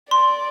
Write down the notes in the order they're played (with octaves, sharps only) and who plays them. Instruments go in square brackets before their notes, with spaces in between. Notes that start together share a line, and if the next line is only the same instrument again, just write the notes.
[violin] D5 [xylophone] C6